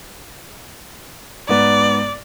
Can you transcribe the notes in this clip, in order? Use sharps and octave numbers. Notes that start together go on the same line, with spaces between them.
G#2 B3 D5